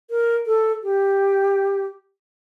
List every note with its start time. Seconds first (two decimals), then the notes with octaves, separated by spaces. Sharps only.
0.10 A#4
0.46 A4
0.83 G4